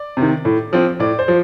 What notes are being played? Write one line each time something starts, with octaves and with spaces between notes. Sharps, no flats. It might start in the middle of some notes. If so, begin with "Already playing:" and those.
Already playing: D5
C3 D#3
A2
F3 C4
A2 D5
C5
F3